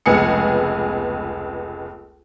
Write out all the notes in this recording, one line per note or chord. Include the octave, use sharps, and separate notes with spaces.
F1 C#2 B3 G#4 C#7